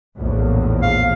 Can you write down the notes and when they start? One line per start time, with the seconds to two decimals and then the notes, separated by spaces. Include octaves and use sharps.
0.17 A#1 E2 A2
0.82 F5